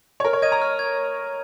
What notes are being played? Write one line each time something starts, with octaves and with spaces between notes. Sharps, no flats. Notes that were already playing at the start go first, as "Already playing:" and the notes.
C#5
A#4 F6
C#5
D#5 G#6 D#7
A#5
F6
G#6